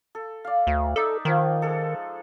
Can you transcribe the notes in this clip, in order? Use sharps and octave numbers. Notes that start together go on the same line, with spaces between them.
A4
D5 F5
D2
D#4 A4 D5 E5
D#3 F3 A#3
G#3 A4